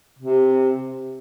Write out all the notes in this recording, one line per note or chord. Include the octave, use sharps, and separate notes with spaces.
C3